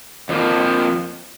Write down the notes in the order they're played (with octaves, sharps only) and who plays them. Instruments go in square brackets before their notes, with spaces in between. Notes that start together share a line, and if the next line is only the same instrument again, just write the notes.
[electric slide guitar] F2 F3 A#3